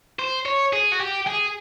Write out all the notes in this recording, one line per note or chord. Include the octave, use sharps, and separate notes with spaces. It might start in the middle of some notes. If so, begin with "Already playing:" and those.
C5
C#5
G#4
F#4
G4
G#4